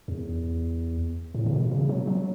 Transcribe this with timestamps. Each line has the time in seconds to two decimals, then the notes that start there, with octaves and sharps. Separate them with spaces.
0.08 E2
1.34 A2
1.46 C#3
1.53 B2
1.71 C#3
1.89 F#3
2.07 F#3